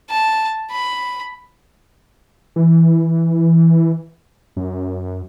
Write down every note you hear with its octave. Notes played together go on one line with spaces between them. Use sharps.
A5
B5
E3
F#2